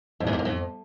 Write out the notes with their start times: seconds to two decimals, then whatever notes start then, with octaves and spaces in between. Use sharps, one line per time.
0.20 F2
0.27 E2
0.33 F2
0.39 F#2
0.45 F2